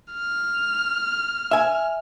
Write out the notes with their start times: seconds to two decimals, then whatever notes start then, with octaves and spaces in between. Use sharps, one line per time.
0.13 F6
1.51 E5 G#5